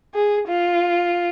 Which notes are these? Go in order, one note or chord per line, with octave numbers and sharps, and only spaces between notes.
G#4
F4